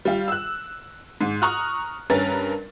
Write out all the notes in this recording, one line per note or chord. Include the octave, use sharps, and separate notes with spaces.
G3 F4
E6 F#6
G#2
A#5 C#6 D#6 F6 F#6
G2 C#4 A#4 B4 A6